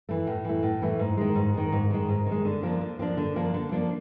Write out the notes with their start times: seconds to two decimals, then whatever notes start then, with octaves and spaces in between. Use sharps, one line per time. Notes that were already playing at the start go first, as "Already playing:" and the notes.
0.09 E3 A3
0.27 A2
0.45 E3 A3
0.63 A2
0.82 E3 A3
0.99 G#2
1.17 D#3 G#3
1.35 G#2
1.54 D#3 G#3
1.72 G#2
1.90 D#3 G#3
2.09 G#2
2.27 D#3 G#3
2.45 D3
2.63 F3 A#3 D4
2.81 D3
2.99 F3 A#3 D4
3.17 D3
3.36 F3 A#3 D4
3.54 D3
3.71 F3 A#3 D4